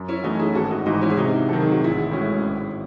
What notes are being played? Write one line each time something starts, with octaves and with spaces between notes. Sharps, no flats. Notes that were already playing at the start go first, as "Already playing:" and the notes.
Already playing: F#2
C#4 E4
E3 A3 C#4 D#4 F#4
E4 G#4
G#1 F#4 A4
D#4 F#4
G#2 E3 D#4 F#4
C#4 E4
G#4
C3 D#4 F#4
D#3 F#3 C4 A4
G#4
F#4
A1 E4 G#4
A2 G#3 C#4 F#4
G#1